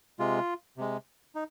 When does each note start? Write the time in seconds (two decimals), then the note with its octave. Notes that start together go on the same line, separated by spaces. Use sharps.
0.19 C3 G#3 F4
0.77 C3 G#3
1.35 D#4